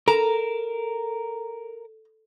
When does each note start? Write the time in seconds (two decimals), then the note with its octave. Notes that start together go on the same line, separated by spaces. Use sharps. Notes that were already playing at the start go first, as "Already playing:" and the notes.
0.08 A4 A#4 A#5